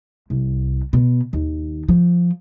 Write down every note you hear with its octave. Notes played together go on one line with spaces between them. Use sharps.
C2
B2
D#2
F3